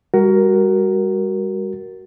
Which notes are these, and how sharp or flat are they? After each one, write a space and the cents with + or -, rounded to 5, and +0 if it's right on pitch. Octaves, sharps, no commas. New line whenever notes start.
G3 +35 F#4 +20 A#4 +0